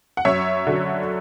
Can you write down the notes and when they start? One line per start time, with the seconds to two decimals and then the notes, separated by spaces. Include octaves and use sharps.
0.17 F#5
0.25 F#2 C#5 E5
0.67 D3 F#3